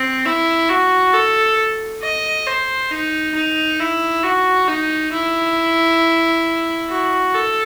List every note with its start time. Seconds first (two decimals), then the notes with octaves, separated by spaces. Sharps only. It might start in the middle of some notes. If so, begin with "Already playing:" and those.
Already playing: C4
0.25 E4
0.69 F#4
1.13 A4
2.03 D#5
2.46 C5
2.91 D#4
3.35 D#4
3.80 E4
4.23 F#4
4.68 D#4
5.13 E4
6.90 F#4
7.34 A4